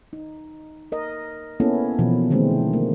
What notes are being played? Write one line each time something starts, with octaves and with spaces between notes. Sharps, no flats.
D#4
A#4 D#5
A#3 B3 C#4 E4 A4
B2 E3 F3
D3 D#3 G#3 A3 C4 D4
A#3